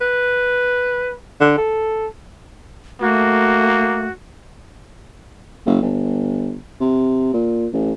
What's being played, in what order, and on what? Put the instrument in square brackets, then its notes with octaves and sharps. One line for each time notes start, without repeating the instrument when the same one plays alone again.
[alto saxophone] B4
D3
A4
[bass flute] A3 [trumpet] A#3 [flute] F#4
[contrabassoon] F#1
G1
C3
A#2
A1